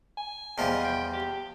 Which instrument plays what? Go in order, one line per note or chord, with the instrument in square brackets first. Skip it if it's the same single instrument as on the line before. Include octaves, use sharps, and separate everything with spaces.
[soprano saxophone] G#5
[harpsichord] E2 F3 G3 [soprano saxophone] D#5
[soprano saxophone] G5
G4